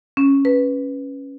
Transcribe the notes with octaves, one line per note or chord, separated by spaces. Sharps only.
C#4
B4